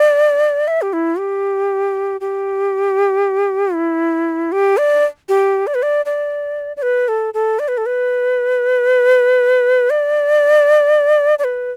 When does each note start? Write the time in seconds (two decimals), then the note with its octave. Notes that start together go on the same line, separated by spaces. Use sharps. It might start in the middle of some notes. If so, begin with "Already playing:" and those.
Already playing: D5
0.68 E5
0.82 G4
0.93 E4
1.19 G4
2.21 G4
3.75 E4
4.52 G4
4.77 D5
5.29 G4
5.67 D5
5.75 B4
5.83 D5
6.06 D5
6.77 D5
6.82 B4
7.08 A4
7.34 A4
7.59 D5
7.68 B4
7.78 A4
7.86 B4
9.90 D5
11.39 D5
11.44 B4